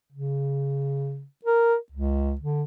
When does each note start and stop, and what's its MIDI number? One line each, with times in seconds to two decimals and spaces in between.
0.12 1.24 49
1.45 1.76 70
1.92 2.35 37
2.41 2.64 50